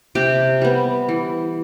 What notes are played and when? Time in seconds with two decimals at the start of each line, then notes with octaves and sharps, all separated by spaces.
0.15 C3 G4
0.61 G3 B3
1.09 E3